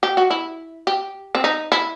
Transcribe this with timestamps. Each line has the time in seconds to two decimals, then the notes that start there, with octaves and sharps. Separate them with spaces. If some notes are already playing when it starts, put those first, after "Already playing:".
0.03 G4
0.17 F#4
0.30 E4
0.87 G4
1.35 C4
1.44 D#4
1.72 E4